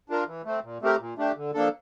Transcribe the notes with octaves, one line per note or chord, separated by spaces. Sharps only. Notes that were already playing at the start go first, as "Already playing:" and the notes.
D4 F4 A#4
E3
A3 C4
A#2
A3 C4 G4 A#4
A#2
A3 D4 G4
D3
F3 A#3 D4 A4